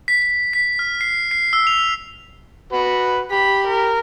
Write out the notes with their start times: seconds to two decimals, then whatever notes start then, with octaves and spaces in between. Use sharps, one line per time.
0.08 B6
0.22 B6
0.53 B6
0.79 F6
1.01 C7
1.31 C7
1.53 E6
1.67 F7
2.73 F#4 B4
3.31 G4 B5
3.67 A#4